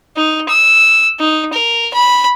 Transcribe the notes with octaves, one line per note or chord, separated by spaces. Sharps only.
D#4
E6
D#4
A#4
B5